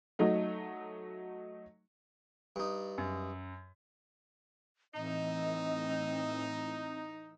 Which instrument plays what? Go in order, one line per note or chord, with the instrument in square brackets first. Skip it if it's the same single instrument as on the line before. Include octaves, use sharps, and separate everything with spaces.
[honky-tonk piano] F#3 A3 D#4
[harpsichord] G2 D#4
[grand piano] F#2
[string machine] A2 E3 E6 [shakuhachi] C4 [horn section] D#4 [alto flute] D#5